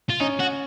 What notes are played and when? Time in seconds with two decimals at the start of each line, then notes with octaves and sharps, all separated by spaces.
0.09 F4
0.20 C#4 D#4
0.39 F#4